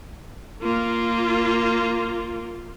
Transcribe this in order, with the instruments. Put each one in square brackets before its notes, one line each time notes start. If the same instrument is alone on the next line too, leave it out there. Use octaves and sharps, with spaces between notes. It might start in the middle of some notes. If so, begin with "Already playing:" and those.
[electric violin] A#3 F4